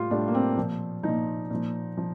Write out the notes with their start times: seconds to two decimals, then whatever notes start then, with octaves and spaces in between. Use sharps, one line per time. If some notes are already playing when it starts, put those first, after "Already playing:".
Already playing: A2 G3 F4 G4
0.11 A2 G3 D4
0.28 A#3
0.34 C4
0.57 A#2 F3
1.03 A#2 F3 D#4
1.50 A#2 F3
1.97 F3